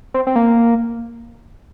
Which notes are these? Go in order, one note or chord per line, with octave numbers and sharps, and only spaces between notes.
C4
C4
A#3